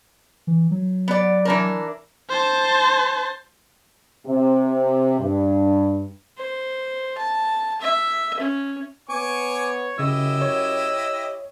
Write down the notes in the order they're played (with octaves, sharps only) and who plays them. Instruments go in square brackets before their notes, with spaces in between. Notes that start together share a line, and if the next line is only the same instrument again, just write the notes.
[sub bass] E3
F#3
[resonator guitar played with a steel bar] B3 D5
E3 D4 A#4
[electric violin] C5 A5
[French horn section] C3
G2
[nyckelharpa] C5
A5
E5
C#4
[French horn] B3 [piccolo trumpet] C#5 [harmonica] G#5 C#6 D6
[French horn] F#2 [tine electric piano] C#3 [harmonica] E4 G4 D#5 [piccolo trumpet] E6
[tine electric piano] C#5